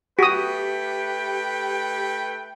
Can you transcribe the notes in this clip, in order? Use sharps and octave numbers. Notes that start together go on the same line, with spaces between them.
A3 F#4 G4 B4 G5 D#6